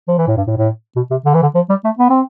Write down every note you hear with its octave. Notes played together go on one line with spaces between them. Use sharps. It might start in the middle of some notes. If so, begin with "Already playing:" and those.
F3
E3
A2
G2
A2
A2
B2
C3
D3
E3
D3
F3
G3
A3
B3
C4